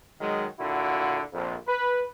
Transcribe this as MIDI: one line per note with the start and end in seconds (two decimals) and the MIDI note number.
0.21 0.46 51
0.21 0.46 54
0.21 0.46 56
0.59 1.22 46
0.59 1.22 50
0.59 1.22 64
0.59 1.22 66
1.33 1.55 34
1.33 1.55 41
1.67 2.05 71